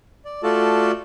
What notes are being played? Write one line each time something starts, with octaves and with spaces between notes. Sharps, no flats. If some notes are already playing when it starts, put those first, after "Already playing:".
D5
A3 F4 F#4 A4 D5 A5